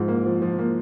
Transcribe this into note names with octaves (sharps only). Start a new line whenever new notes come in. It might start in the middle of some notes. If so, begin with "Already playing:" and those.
Already playing: G#2 F3
A#3
F3
F3
A#3